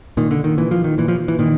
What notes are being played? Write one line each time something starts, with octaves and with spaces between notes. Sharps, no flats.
A#2 D#3
D3
D#3
A#2 E3
F3
D#3
A#2 E3
F3
E3
A#2 D#3